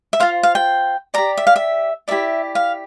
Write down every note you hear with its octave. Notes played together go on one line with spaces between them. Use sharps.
E5
F4 C5 F5
F5
G5
G4 D5 A#5
E5
F5
E5
E4 G4 A#4 D5 E5
F5